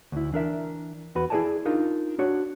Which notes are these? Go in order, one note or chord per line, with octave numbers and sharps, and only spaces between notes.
D2 E4
E3 D4 A#4 E5
E2 F#4 B4
E4 G#4 A#4 D5 G#5 A5
D4 D#4 F4 A#4
D4 F#4 C#5